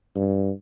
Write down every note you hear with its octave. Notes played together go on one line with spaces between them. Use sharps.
G2